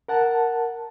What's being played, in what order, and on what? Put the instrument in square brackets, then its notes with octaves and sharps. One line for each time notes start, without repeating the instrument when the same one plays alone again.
[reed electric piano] A#4 F#5 A5